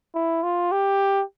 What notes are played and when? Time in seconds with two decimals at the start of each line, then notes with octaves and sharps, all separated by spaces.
0.15 E4
0.43 F4
0.72 G4